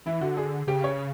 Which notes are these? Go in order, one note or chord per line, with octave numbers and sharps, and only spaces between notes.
E3 E4
D3 F#4
G#4
C#3 G4
C#5